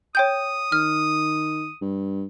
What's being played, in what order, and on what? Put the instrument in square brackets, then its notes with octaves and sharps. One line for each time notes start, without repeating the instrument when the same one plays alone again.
[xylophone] C#5 G5 G6 [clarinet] D#6
[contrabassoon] D#3 [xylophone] F6
[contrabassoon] G2